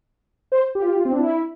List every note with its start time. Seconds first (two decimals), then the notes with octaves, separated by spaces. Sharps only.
0.52 C5
0.75 G4
0.82 F4
0.88 G4
0.96 F4
1.05 C4
1.12 D4
1.19 E4